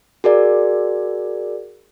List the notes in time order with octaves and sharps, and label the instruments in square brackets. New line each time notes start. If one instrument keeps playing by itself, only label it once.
[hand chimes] F#4 G#4 A#4 D5